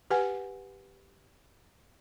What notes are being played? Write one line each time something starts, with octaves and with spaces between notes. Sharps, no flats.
G4 B4 F#5 G#5